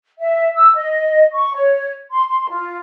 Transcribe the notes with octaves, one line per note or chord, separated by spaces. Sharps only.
E5
E6
D#5
C#6
C#5
C6
C6
F4